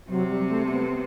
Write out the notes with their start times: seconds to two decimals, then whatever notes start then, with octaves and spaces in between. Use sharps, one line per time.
0.09 C3 F#3
0.30 G3
0.49 A3
0.69 B3